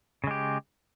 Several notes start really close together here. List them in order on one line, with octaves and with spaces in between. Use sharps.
C#3 G#3 G4